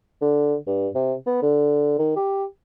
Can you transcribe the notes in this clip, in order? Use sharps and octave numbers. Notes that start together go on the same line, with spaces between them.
D3
G2
C3
B3
D3
D#3
G4